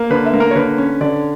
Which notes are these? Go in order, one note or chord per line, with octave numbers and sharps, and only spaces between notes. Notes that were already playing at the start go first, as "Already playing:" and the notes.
Already playing: A#3
D3 B4
E5
A#3
A#4
C#5
D3 B4
C#4
D3 D5